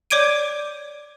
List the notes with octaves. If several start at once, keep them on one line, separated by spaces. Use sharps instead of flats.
C#5 D5 D6 G#6 D7 D#7